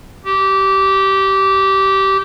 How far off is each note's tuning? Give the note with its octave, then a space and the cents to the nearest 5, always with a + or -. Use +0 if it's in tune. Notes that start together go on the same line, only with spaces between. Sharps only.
G4 -20